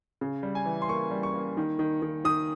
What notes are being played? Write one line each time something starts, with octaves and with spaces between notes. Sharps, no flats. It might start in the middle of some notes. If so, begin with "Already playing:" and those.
C#3
G3
G#5
E3
C6
A#3 C#6
G3
C#6
A#3
D#3
D#3
D#3
D#3 D#6